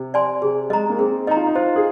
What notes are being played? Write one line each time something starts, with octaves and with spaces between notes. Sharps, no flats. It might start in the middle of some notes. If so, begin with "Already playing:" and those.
Already playing: C3
D5 G#5 C6
C3 G#4
G#3 D#5 A#5
A#3
C4 G#4
D#4 D#5 A#5
F4
D#4
F4 C5
G#4